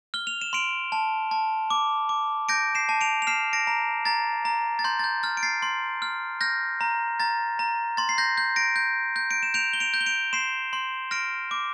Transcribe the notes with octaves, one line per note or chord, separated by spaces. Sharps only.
F6 G7
F7
E7
C6 D7 F7
A5
A5
D6
D6
G6 A#6 D7
C7 E7
A5
D7 F7
F7
F6 C7 E7
A#6 D7
A#5
A#5 A6
A#5
A6
C6 G6
A6
G6
F6 A6
D7
A6 C7
C6
F6
F6 G6 A#6
A#5
A#5 A6
A#5
C6 A6
C7
G6 A#6
G6
A#6 D7
G6
G6
D7
E7
G6 D7 F7
G7
D7 F7
G6
G7
D7 F7
C6 C7 E7
C6
F6 A#6 D7
D6